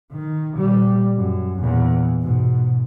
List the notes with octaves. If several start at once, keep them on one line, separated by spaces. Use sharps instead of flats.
D#3
A#2 G3
F#2
E2 A#2
G#2 B2